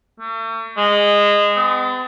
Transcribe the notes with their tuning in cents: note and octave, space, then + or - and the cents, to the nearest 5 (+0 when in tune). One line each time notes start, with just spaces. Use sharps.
A3 +40
G#3 -20
B3 +45